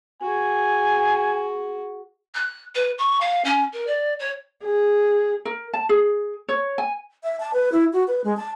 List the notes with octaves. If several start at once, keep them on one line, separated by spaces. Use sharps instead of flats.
F#4 G#4 G#5
F#6
B4
C#6
F5
C#4
A#4
D5
C#5
G#4
A#4
A5
G#4
C#5
G#5
E5
A5
B4
E4
F#4
B4
G#3
A5